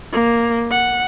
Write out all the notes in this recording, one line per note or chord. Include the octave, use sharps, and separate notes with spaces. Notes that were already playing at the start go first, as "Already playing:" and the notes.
A#3
F#5